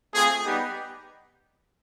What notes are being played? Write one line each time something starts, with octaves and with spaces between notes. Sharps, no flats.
A3 C4 F4 G#4
G3 B3 D#4 G4